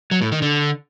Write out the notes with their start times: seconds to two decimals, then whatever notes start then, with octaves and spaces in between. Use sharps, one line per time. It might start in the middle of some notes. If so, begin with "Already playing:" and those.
0.11 F#3
0.22 A2
0.32 D#3
0.42 D3